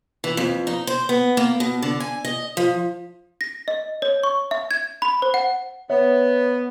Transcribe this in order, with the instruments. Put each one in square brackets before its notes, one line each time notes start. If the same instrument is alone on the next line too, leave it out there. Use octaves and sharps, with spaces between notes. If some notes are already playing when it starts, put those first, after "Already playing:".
[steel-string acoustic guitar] E3
F2
D#4
C5
B3
A#3
B2
D3
G#5
D#5
F3
[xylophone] A#6
D#5
C#5
C#6
E5
G#6
B5
C5
F#5
[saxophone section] B3 [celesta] C#5 E5